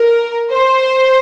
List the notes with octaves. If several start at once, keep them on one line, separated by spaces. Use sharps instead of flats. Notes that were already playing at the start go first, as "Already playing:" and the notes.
Already playing: A#4
C5